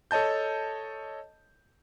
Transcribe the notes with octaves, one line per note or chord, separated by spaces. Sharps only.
A4 C#5 D#5 A5 G6